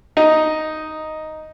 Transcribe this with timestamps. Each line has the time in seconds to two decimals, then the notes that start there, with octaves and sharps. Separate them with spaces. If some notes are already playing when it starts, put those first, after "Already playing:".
0.17 D#4